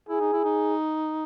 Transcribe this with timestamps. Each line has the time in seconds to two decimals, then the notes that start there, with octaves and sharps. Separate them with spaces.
0.09 E4 G#4
0.21 D#4
0.33 E4
0.45 D#4